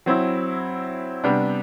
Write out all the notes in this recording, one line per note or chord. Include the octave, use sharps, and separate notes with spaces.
F#3 C4 E4
C3 G3 B3 D4